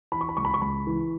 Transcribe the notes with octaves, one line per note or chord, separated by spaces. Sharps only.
E3 B5
C#6
B5
C#2 C#6
B5
C#6
C#2 B5
E3